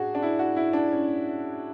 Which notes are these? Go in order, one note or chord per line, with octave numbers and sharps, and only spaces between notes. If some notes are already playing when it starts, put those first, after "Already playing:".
Already playing: A2 D4 F#4 G#4
D4
E4
F#4
E4
D4
C#4